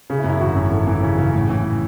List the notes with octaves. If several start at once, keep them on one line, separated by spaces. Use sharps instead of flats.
C#3 G#4
E4
F#2
E4
G#1 F#4
F#2
E3 A4
E3
C#3
C#3
A2
E3